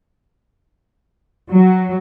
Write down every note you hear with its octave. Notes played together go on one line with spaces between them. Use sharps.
F#3